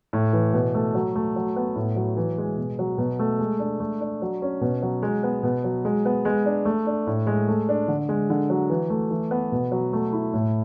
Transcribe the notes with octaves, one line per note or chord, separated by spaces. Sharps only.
A2
E3
B2
A3
F#3
A3
F#3
B3
A2
F#3
E3
G#3
B2
F#3
B2
A3
G#3
D4
A3
D4
F#3
C#4
B2
F#3
G#3
B3
B2
F#3
G#3
B3
G#3
D4
A3
D4
A2
G#3
A3
D4
D3
G#3
D3
F#3
E3
A3
E3
B3
B2
F#3
A3
E4
A2